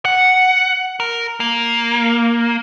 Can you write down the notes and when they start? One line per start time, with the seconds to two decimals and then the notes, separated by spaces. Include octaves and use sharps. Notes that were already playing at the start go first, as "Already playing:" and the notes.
0.05 F#5
1.00 A#4
1.40 A#3